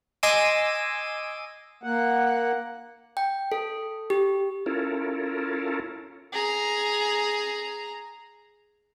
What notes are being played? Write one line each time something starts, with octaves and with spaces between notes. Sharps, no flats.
D#5 G#5 C6 D6 E6 D#7
A#3 F#5
G5
A4
G4
C#4 E4 F4 A4 A#4
G#4 A#5